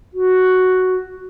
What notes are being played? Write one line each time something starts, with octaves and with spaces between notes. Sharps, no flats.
F#4